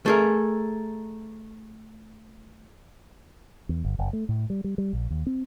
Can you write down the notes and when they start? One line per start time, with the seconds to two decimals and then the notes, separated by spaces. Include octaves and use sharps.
0.06 A3 G#4 A#4
3.69 E2
3.84 G1
3.99 F#1
4.13 A3
4.29 A2
4.50 G3
4.64 G3
4.78 G3
4.93 A#1
5.10 D#2
5.27 C4